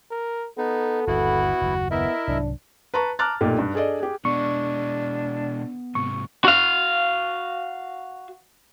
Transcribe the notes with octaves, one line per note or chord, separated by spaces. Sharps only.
A#4
B3 D#4 A4
G1 D#2 B3 E4 F#4
F#1 D#2
B3 E4 A#4 D#5 E5
C2 G#2 F#3 D4
B4 A5 A#5 C#6
A5 A#5 D6 F6 F#6 A6
B1 A#2 A3 G4
G2
D4 G#4 A4 D5 D#5
G4 G#4
B2 G#3 B3 D4 C#6
G#2 C3 C#6
F#4 F5